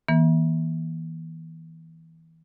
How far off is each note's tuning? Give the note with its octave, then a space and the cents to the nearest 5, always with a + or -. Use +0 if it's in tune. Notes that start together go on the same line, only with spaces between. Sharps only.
E3 -25 A#3 +35